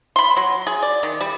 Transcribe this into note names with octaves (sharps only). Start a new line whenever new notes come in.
B5 C6
F#3
G#4
D5
D#3
G3